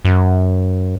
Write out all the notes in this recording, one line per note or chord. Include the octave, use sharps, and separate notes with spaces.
F#2